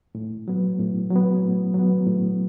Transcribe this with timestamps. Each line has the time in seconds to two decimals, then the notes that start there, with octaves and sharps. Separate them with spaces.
0.15 A2
0.48 F#3 B3
0.79 A2
1.10 F#3
1.16 B3
1.42 A2
1.74 F#3 B3
2.07 A2